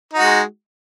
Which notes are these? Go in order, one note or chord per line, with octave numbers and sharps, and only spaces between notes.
G#3 D#4 F#4